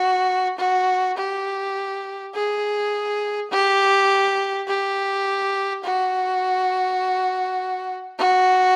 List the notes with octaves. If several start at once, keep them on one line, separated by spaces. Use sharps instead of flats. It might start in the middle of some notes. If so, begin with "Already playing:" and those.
Already playing: F#4
F#4
G4
G#4
G4
G4
F#4
F#4